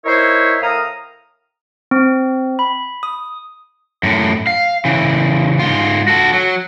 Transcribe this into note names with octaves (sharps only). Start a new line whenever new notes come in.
D#4 E4 A#4 C5 C#5 E5
A2 A#4 F5 A#5 D#6
C4
B5
D#6
F#2 A2
F5
C#3 E3
G#2 F4
F#4 A4
F#3